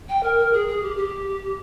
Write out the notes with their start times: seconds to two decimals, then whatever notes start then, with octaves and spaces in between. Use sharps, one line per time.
0.09 G5
0.23 A#4
0.39 A#4
0.53 G#4
0.68 G#4
0.82 G4
0.97 G4